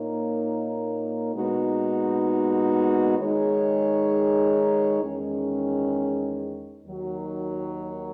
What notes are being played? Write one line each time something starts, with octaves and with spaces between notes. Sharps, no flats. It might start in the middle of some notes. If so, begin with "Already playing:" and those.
Already playing: A#2 A#3 D#4 A#4 C#5
A#2 G#3 B3 D#4 F#4
D#3 G#3 D#4 G#4 C#5
E2 D#3 G#3 C#4
D#2 D#3 F#3